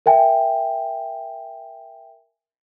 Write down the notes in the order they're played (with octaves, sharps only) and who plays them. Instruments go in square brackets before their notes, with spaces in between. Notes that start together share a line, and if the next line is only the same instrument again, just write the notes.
[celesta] A#4 E5 G5 G#5